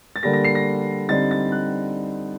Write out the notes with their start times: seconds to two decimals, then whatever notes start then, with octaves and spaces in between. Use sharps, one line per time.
0.16 A6
0.23 D3 G3 A#3 A#6
0.33 A#6
0.44 C7
0.55 A#6
1.09 D3 G3 C4 D#4 A6
1.31 A6
1.52 F#6